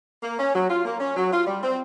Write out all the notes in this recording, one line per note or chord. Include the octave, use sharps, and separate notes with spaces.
A#3
C#4
F#3
F4
A#3
C#4
F#3
F4
G3
C4